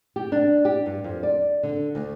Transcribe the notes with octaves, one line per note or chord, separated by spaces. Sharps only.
G4
D4
G4
G2
F2
D5
D3
D2